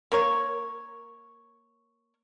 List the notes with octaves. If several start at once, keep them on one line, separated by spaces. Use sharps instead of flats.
A#3 A#4 C#5